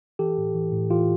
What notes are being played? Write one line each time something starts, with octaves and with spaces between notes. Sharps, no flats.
E3 G4 A4
A2
E3
A2
E3 F4 G4